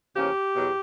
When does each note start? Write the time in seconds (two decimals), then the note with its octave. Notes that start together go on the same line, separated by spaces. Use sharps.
0.15 E2 C#3 F3 A#3 C#4 G4
0.55 E2 B2 F#3